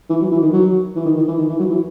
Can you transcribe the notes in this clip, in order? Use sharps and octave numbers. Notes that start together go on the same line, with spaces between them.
E3
F#3
E3
D#3
F#3
E3
D#3
D#3
E3
D#3
E3
F#3
E3